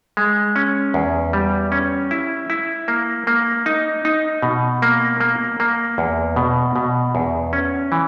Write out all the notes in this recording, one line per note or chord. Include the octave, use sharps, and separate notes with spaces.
G#3
C#4
E2
G3
C#4
E4
E4
A#3
A#3
D#4
D#4
B2
A#3
A#3
A#3
E2
B2
B2
E2
C#4
E3